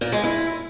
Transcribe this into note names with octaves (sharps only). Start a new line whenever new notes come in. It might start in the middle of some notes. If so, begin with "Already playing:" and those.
A#2
G#3
E4